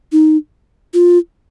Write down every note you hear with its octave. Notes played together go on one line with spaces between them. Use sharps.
D#4
F4